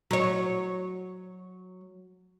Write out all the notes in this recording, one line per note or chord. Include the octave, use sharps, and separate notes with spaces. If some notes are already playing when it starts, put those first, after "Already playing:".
F#3 C#5